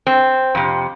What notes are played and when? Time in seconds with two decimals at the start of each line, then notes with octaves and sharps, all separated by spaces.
0.07 C4
0.55 F2 C3